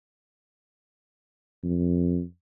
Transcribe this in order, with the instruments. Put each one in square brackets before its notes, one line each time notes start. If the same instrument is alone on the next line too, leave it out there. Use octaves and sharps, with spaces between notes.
[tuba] F2